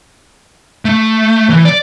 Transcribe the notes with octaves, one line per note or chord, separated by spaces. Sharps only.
A3
E3
D5